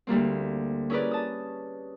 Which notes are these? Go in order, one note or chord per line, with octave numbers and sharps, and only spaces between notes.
D2 G3 A#3 C4
C#4 E4 G#4 A#4 B4 D5
A5 D#6